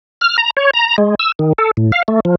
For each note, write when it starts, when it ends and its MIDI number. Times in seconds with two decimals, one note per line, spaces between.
0.21 0.37 89
0.38 0.50 82
0.57 0.71 73
0.74 0.96 82
0.98 1.15 56
1.19 1.32 88
1.39 1.53 51
1.58 1.71 69
1.77 1.92 45
1.92 2.03 77
2.08 2.20 57
2.25 2.35 53